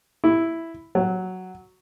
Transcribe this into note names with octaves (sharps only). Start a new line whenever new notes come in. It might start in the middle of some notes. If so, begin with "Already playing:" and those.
E4
F#3